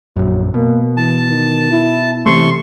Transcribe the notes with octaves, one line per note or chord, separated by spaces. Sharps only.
A#1 F#2 F#3
B2 A#3
E3 A5
D#3
E4
C3 E3 A3 C6 C#6